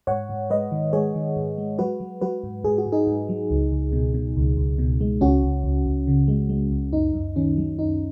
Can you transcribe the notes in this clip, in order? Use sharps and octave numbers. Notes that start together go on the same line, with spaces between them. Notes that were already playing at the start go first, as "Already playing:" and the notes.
G#2 C#5 F#5
G#2
G#3 B4 D#5
D#3
G#3 G#4 C#5
D#3
G#2
G#3
F#3 F#4 B4
F#3
F#3 F#4 B4
G#2
G#2 G#4
F#4
G#2
D#4 G#4
G#2
F#3
C#2
C#2
B2
B2
C#2
C#2
B2
G#3
C#2 C#4 F#4
C#2
C#2
C#2
C#3
G#3
G#3
C#2
F#2 D#4
F#2
D#3 C#4
F#3
F#2 D#4